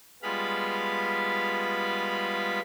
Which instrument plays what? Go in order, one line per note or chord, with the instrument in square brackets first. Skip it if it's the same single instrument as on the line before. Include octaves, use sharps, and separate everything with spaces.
[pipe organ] G3 G#3 B3 F4 F5 B5